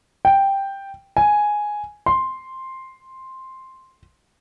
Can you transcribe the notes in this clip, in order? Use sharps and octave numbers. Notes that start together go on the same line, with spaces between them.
G5
G#5
C6